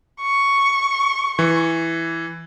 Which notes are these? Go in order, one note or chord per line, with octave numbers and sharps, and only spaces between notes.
C#6
E3